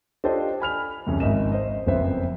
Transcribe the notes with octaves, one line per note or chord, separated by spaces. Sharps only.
D4 F4 G4 A4 C5 D#5
G#5 B5 F6 F7
C2 F2 C#3
G#1 G#2 D#5 E5 E7
C5 D#5
F#1 F2 B3 C5 E5